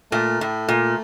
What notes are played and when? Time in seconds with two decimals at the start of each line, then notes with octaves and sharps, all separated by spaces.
0.12 A#2 A3
0.41 A2
0.68 A#2